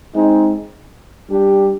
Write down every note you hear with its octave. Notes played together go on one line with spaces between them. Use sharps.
G#3 C4 D#4
G3 D4 G4